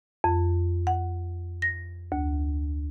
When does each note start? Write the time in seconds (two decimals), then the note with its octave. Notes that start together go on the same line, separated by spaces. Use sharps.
0.24 F2
0.87 F#5
1.62 A#6
2.12 D2